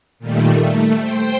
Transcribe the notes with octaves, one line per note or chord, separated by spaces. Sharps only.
A#2 D#3 G3 A3
A3
C5 G5